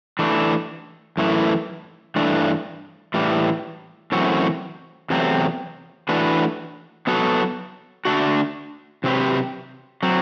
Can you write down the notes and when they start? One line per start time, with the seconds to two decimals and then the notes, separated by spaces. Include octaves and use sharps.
0.19 E3 A3 D4
1.17 F#2 E3 A3 E4
2.16 G2 E3 A3 D4
3.14 A2 E3 G3
4.12 F#2 E3 A3 C4 F#4
5.10 E2 C3 F#3 A3 C4
6.09 E3 A3 D4 F#4 B4
7.07 F#3 B3 F#4 A4
8.05 D3 A3 D4 F#4
9.04 C3 F#3 C4 G4 B4
10.03 F#3 C4